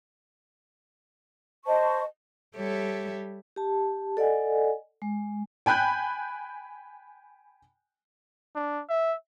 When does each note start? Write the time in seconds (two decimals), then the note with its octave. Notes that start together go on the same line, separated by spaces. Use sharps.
1.65 C5 D#5 A5 C#6
2.55 G3 G4 A4 C#5 E5
3.56 G4 A5
4.17 A4 D5 D#5 F#5 G#5
5.02 G#3
5.66 G5 G#5 B5 F#6 G6
8.55 D4
8.89 E5